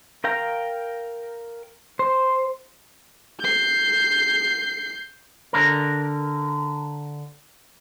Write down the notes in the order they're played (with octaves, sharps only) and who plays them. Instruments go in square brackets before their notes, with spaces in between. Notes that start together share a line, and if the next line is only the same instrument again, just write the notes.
[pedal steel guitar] A#4 F5 G5 A#5
C5
[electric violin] G6 C7
[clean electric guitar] D3 A#4